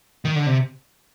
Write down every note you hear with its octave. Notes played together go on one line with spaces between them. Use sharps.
D#3
D3
C3